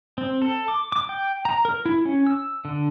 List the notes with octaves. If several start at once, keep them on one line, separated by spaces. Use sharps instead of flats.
C4
A4
D6
D6
G5
A#5
A#4
E4
C#4
E6
D3